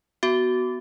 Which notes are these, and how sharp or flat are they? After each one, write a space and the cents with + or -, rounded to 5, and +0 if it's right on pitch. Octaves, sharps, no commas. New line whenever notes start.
B3 +0 F#4 +10